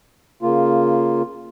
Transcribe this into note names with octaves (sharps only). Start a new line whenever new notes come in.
C#3 A#3 F4